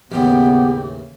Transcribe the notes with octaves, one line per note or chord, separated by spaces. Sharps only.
A1 D#2 C#3 E3 B3 G4